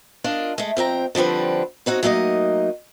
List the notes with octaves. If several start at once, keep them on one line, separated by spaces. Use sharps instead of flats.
D4 F4 A#4 D#5
G#3 A3
F2 C4 G5 A#5
D3 F3 G3 C4 B4
C4 D#4 F#4 C#5
F#3 A3 A#3 D#4 D#5